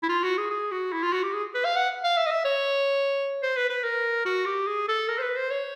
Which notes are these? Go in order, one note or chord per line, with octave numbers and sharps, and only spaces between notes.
E4
F4
F#4
G#4
G#4
F#4
E4
F4
F#4
G4
G#4
B4
F5
F#5
F5
E5
D#5
E5
C#5
C5
B4
B4
A#4
F#4
G4
G#4
A4
A#4
C5
B4
C5
C#5